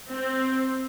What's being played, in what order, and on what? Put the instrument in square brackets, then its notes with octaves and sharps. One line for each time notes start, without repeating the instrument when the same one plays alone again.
[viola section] C4